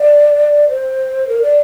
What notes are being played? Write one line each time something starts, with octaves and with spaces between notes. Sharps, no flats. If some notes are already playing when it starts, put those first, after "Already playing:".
Already playing: D5
C5
A#4
D5